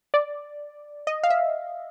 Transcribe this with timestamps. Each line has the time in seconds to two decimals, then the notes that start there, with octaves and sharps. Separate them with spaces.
0.14 D5
1.07 D#5
1.23 F5
1.30 E5